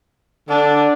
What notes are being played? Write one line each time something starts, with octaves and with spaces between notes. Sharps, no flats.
D3 D4